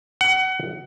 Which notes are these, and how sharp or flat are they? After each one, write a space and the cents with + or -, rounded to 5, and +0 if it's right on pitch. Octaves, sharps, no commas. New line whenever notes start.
F#5 +25